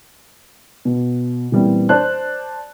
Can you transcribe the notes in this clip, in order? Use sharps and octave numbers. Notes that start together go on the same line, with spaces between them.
B2
A#2 E3 G3 B3 C4
C5 D5 A5 F#6